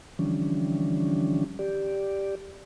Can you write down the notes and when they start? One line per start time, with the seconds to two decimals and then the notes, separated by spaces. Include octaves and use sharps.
0.19 D3 E3 F3 G3 C#4 D4
1.59 G4 D5